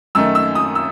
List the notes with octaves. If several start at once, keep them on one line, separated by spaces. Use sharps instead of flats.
F#2 D#3 A3 E6
E6
D#6
E6